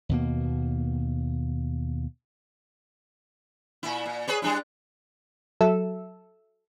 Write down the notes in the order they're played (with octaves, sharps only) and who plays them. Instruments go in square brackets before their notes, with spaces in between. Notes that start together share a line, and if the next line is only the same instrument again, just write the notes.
[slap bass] D#2 B2 A#3
[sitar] A#2 E4
A#2
G#4 B4 C#5
G3 D4 E4
[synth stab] F#3 A4 E5 E6